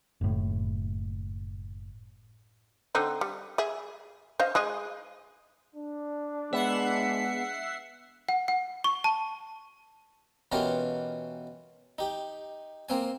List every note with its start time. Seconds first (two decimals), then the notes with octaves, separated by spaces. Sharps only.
0.21 F#1 A2
2.95 D3 C4 D#4
3.21 G3
3.58 G#4 E5
4.40 C5 D#5 F5
4.55 G#3 G#4 D#5
5.75 D4
6.53 G#3 B3 E5 F#5 C7
8.29 F#5
8.48 F#5
8.84 C#6
9.04 A5
10.52 B2 E3 C#4 F4 G4 A#4
11.98 D#4 G4
12.89 A#3 C4 G#5